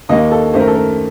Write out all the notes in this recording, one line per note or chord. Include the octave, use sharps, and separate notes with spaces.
D#2 D#3 A#3 D#5
A4
F#2 D#3 A3 C5
A#4
A4
A#4